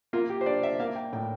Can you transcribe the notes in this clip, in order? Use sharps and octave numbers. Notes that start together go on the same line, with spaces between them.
A#3 F4
G4
C5
D4 D5
E5
A#3 F5
G5
A2 G5